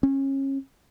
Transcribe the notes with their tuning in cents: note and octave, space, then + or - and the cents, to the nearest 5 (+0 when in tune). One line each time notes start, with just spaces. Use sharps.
C#4 -30